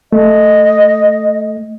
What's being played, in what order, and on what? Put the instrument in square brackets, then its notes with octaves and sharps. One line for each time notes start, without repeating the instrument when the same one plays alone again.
[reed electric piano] A3 [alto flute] D#5